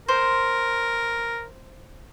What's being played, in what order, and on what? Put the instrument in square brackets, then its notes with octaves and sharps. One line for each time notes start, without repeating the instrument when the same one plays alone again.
[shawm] A#4 [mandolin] C5